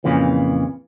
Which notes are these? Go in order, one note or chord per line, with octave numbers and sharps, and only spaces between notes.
F2 A#2 C#3 E3